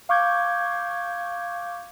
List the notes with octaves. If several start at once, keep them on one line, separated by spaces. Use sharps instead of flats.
F5 C#6 D6 G6 G#6